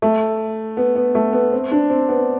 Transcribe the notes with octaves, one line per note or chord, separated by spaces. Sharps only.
A3
B3
B3
A3
B3
C4
D4
C4
B3